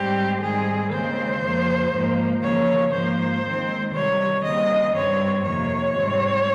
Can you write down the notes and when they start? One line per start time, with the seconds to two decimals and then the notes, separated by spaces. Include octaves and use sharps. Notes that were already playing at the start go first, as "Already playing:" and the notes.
Already playing: G#2 G3 C4 G4
0.40 G#2 D#3 G3 C4 G#4
0.91 D#2 C#3 G#3 C4 C5
1.41 F2 C#3 F3 A#3
1.92 G#2 F3 A#3
2.42 D#2 C#3 F3 A#3 C#5
2.92 G#2 F3 A#3 C5
3.43 D#2 D#3 G#3 C4
3.93 C3 D#3 G3 C#5
4.43 D#2 C#3 G3 C4 D#5
4.94 G2 G3 C4 C#5
5.44 F2 C3 D#3 A#3 C#5
5.95 G#2 G3 C4